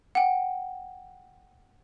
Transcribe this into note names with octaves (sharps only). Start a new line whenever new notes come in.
F#5 G5